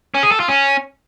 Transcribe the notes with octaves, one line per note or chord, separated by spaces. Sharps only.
C#4
G#4
A4
F4
C#4